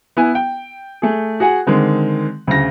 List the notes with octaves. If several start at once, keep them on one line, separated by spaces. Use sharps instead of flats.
B3 E4 G#5
G5
A3 G#4
F#4 G#4 F#5 G#5
D3 D#3 G#3 C4
D2 C#3 A#6